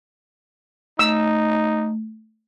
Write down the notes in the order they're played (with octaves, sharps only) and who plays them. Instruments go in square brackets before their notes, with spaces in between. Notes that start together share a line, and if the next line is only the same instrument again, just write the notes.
[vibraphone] A3 [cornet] D#4 [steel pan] E6